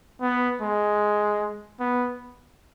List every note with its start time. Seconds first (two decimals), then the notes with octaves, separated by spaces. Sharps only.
0.21 B3
0.61 G#3
1.80 B3